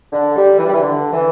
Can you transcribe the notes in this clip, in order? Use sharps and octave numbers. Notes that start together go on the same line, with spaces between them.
D3
G3
E3
G3
E3
D3
E3